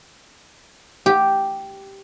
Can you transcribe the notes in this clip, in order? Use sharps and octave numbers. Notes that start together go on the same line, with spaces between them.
G4